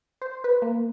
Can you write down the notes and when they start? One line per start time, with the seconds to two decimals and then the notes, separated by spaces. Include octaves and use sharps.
0.22 C5
0.44 B4
0.62 A#3